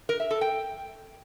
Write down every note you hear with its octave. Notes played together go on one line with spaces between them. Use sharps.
A#4
E5
A4
G5